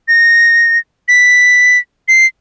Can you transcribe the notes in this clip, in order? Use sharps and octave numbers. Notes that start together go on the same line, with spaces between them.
A#6
B6
C7